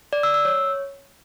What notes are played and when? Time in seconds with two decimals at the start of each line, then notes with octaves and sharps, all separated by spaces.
0.13 D5
0.23 E6
0.34 E6
0.45 C#5